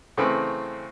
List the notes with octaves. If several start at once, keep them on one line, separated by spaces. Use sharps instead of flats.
A2 C#3 E3 C4 B5